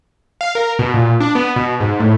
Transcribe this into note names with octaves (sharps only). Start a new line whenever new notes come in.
F5
A#4
B2
A#2
D4
B3
B2
G#2
A2